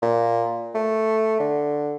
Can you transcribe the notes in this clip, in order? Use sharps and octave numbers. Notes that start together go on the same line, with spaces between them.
A#2
A3
D3